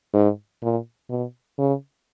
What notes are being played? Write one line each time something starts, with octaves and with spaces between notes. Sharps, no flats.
G#2
A#2
B2
C#3